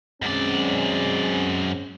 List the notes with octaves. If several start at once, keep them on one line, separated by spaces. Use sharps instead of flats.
F#2 G#3 C4 C#4 D5